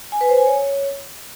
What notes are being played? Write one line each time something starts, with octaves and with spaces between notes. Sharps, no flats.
G#5
B4
C5
G#5
C#5